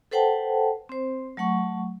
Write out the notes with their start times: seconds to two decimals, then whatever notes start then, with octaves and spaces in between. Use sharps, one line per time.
0.11 A4 B4 C5 F#5 G5 A5
0.89 C4 C5
1.37 F#3 A3 F#5 C#6